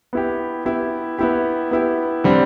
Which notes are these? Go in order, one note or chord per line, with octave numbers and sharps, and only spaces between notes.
B3 E4 G4
B3 E4 G4
B3 E4 G4
B3 E4 G4
D3 G3 C4